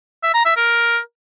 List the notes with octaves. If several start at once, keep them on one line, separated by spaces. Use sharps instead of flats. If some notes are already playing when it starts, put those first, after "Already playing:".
E5
A#5
E5
A#4